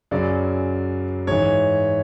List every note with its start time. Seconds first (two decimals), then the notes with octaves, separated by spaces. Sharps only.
0.11 F#2 C#3 F#3 D5
1.27 G#2 E3 C#5